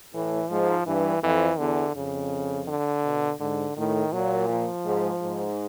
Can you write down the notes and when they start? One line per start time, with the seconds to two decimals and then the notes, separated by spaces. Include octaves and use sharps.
0.14 A2 E3
0.50 G#2 F3
0.86 G2 E3
1.23 F2 E3
1.59 E2 D3
1.95 F2 C#3
2.68 D3
3.03 B2
3.40 G#2 D3
3.77 A2 D#3
4.13 A#2 F#3
4.49 F3
4.85 G#2
5.22 G#2